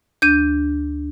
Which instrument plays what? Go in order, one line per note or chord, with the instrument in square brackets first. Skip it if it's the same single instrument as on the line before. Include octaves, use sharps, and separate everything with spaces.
[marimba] D2 D4 [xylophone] G6 D#7